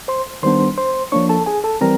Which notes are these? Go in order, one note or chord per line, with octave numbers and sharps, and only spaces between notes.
C5 C6
D#3 G3 B3 D4 C5 C6
C5 C6
F3 A#3 D4 C#5 C#6
A4 A5
G#4 G#5
A4 A5
E3 G3 C4 A#4 A#5